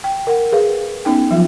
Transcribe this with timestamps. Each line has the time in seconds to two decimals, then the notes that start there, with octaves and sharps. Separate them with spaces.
0.04 G5
0.27 A#4 F#5
0.52 G#4 B4 F5
1.05 B3 C#4 D#4 G5
1.31 F3 F#3 F4